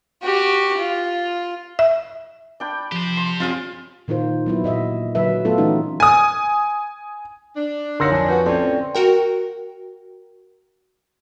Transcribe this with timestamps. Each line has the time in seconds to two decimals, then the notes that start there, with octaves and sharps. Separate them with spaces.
0.22 F#4 G4
0.77 F4
1.79 E5
2.60 D4 G5 B5
2.92 F3 G4 C5
3.17 C6
3.40 C4 C#4 F4 G#4 F5
4.08 A#2 D#3 D#4 F4 C5
4.46 F#3 B3 E4
4.64 A#2 D#5 E5
5.15 D3 F#3 B4 E5
5.45 F#3 A3 B3 F4 A4
5.58 E3 A3 C#4 D#4
6.00 G#5 D#6
7.54 D4
8.00 D#2 D3 C#5 F5 F#5 C6 E6 A#6
8.11 F2 D4 G#5 A5
8.28 F#4 B4
8.46 A2 F3 C4 C#4 A4 D5 G5 A5
8.95 F#4 A#4 G5